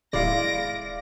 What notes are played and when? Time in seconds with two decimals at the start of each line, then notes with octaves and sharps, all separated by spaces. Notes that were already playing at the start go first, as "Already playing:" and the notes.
0.13 D1 G#3 E4 D5 F5 A#6 D7